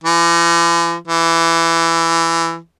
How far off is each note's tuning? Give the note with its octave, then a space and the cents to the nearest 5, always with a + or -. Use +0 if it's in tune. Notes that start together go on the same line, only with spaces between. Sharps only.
E3 +45
E3 +15